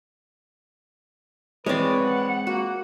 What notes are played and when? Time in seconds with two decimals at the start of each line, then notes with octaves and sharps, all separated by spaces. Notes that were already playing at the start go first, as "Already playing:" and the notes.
1.66 E3 G#3 C4 B4 C#5 D5
2.03 F#5
2.47 A#3 F#4